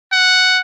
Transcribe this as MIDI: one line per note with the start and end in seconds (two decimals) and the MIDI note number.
0.12 0.60 78